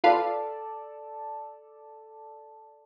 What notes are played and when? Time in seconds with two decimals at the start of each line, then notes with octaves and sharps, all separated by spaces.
0.04 F4 A4 B4 D5 F5